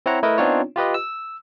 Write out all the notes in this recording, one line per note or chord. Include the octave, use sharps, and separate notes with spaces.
C4 E4 C#5 F#5 A#5
A3 E4 A#4 B4 D#5
B3 C4 D4 D#4 F4 C#5
F4 G4 B4 D#5
E6